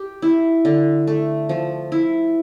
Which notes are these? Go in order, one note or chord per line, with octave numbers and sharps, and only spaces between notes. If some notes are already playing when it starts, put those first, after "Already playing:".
Already playing: G4
E4
D3
A3
F3
E4